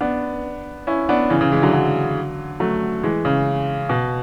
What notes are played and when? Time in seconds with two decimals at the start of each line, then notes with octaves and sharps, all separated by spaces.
0.01 B3 D4
0.87 C#4 E4
1.09 B3 D4
1.30 C#3 E3
1.41 C#3
1.52 E3 G#3
1.63 D3 F#3
1.73 D3 F#3
2.60 F#3 A3
3.03 E3 G#3
3.25 C#3
3.89 B2